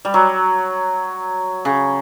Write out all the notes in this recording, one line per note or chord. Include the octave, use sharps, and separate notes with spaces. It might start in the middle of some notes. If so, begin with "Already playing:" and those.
G3
F#3
C#3